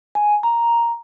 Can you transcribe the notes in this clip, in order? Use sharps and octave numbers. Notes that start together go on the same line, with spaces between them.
G#5
A#5